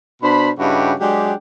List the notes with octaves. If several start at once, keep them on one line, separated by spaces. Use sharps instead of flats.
B2 D4 C5 B5
G2 C#3 D#4 E4 F#4 G4
F#3 G#3 D4 G4